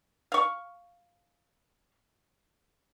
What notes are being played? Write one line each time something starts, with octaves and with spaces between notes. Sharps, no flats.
F5 C#6